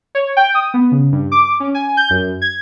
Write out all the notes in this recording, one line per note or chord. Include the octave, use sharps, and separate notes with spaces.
C#5
G5
D#6
B3
C#3
G2
D6
C#4
G#5
G6
F#2
G#6